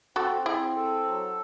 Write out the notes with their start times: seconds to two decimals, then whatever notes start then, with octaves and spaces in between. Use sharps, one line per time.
0.16 C4 F#4 A4
0.46 C4 E4 G#4
0.76 A4
1.06 F#3